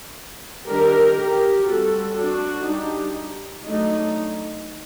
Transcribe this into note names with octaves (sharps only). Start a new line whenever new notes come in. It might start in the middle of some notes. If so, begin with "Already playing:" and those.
D#3 G3 D4 G4 A#4
G4 A#4
G3 C4 F#4 A4
D4 F#4
G3 D4 D#4 G4
F#3 A3 D4 D#4